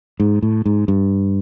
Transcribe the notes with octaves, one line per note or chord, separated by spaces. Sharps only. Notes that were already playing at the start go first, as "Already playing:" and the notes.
G#2
A2
G#2
G2